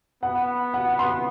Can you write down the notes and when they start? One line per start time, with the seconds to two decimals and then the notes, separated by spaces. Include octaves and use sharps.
0.23 B3 F#5
0.74 F#5
0.99 C6